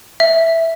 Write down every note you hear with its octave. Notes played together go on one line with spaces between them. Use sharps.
E5